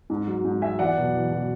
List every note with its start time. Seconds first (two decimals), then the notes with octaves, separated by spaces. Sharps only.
0.10 G#2
0.27 F#3
0.45 G#2
0.62 F#3 E5 G#5
0.79 E2 D5 F#5
0.97 B2 F#3
1.14 E2
1.31 B2 F#3